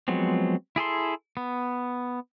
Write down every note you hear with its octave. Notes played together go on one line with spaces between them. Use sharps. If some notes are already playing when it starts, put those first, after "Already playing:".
F3 F#3 G#3 B3 C4
E4 G#4 A4 C6
B3